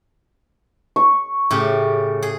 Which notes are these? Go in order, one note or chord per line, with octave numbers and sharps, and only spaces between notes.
C#6
A2 C#3 G4
G#4